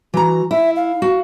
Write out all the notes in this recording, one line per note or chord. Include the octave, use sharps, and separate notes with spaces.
E3 F#4 A#5
E4 E5
F5
F#4